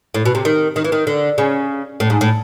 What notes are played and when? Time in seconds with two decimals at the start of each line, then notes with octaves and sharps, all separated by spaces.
0.14 A2
0.25 B2
0.35 C3
0.45 D#3
0.76 D#3
0.84 E3
0.92 D#3
1.07 D3
1.38 C#3
2.00 A2
2.10 G#2
2.21 A2